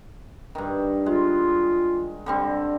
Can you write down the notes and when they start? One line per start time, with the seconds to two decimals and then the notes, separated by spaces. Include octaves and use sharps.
0.55 G2 D#3
1.06 G#3 F4
2.26 D3 G3 C4